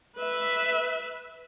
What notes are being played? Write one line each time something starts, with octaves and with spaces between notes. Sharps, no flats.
B4 E5